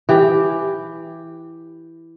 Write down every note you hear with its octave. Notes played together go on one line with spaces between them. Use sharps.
E3 G4